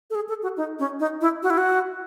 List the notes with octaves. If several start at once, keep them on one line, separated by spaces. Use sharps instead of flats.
A4
G#4
A4
F#4
D#4
C#4
D#4
E4
F#4
E4
F#4